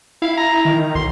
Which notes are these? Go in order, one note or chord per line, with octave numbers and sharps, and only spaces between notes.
E4 F5
A#5
D#3
B1 C6